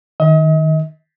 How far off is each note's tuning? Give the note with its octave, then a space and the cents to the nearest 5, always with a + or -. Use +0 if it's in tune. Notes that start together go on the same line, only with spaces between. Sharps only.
D#3 +0 D#5 +40